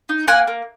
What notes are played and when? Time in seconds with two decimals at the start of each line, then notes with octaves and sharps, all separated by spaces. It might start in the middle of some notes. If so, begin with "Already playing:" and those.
0.09 D#4
0.28 A#3 F#5 G#5
0.48 A#3